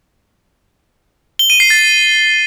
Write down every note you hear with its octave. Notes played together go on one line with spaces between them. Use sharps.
G7
D#7
C7
A6